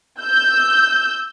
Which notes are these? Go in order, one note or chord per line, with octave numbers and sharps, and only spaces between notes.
E6 G6